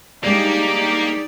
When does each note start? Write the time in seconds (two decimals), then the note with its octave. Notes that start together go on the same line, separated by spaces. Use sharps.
0.24 G3 G#3 A#3 D4 D#4 G4 D5